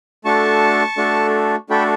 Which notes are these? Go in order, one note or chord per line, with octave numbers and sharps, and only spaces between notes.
A3 D4 F#4 A4 A5 C#6
A3 D4 F#4 A4
A3 D4 F#4 A4 G5 B5